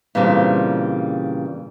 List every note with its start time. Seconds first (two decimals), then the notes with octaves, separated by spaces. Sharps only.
0.15 A#2 C#3 E3 G3 C4 D4